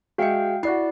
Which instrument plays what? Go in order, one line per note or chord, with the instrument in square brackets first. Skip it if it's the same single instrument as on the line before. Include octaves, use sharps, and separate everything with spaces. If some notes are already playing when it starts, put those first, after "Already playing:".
[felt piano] G#3 E5 C#7 [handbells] F#4 F5 G5
[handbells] E4 D5 F#6 [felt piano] F#4 C7